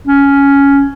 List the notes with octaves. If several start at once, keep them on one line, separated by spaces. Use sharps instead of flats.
C#4